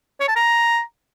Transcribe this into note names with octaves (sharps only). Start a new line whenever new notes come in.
C#5
A5
A#5